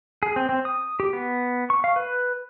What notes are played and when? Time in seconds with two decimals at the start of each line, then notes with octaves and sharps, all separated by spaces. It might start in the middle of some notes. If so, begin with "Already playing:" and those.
0.23 G#4
0.36 C4
0.49 C4
0.65 D#6
1.00 G4
1.13 B3
1.70 C#6
1.84 F5
1.96 B4